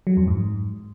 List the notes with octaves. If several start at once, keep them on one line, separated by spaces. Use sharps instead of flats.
F#3
F2
G#2